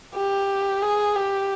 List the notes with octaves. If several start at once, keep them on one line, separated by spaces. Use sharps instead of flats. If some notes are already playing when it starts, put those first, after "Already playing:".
G4
G#4
G4